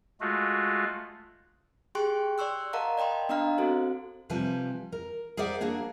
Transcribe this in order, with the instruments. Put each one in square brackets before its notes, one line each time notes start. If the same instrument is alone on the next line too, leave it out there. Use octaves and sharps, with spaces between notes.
[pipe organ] G#3 A3 F4 F#4
[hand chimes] G4 G#4 G5 C6 C#6 F#6
D5 C6 C#6 E6 F#6
A#4 D#5 F5 F#5 A5 A#5
D5 D#5 G5 B5 C6
B3 D4 D#5 F5 A#5 F6
C4 F#4 A4 C5
[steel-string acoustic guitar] C3 F3 G3 B4 G#5
A#4
G#4 A#4 C5 D5 E5 F#5
F#3 A#3 D4 F#4 G#4